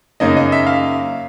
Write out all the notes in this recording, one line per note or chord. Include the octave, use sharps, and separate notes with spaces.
F#2 C#3 F#3 A#3 D#4 D#5
D#5
E5
F5